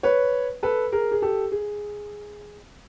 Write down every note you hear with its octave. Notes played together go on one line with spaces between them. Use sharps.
B4 C#5
A4 B4
G#4 A#4
G#4
G4 A4
G#4